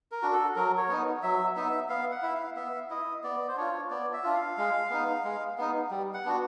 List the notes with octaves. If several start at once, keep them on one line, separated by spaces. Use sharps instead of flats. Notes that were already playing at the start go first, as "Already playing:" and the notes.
A#4
D4 F#4
A4
F#3 A#4
C#5
B3 D#4
F#3 E5
B3 D#4 E5
B3 F5
F#5
E4 E5
F5
B3 E5
E4 D#5
B3 D5
C5
D4 F4 C#5
B3 D5
E5
D4 F4
F5
G#3
B3 D#4
G#3
B3 D#4
G3
F#5
B3 D4 F#4